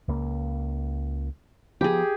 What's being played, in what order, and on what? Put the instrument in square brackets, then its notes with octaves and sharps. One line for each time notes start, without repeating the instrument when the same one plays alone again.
[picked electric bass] C#2 A#3
[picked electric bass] F3 B3 [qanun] G4 G#4